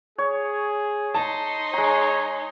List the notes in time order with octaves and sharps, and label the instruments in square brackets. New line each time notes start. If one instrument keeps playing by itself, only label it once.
[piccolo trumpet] G#4 [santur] C#5
[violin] D#4 C6 [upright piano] A5
[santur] G#3 A#5 [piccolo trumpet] C#5